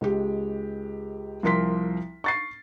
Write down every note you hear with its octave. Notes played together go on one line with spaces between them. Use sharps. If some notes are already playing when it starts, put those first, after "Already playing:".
C#2 G#3 G4
C2 F3 A#4 C6 B6
C#6 A6 C7